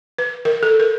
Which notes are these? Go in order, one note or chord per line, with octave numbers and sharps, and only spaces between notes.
B4
A#4
A4
A#4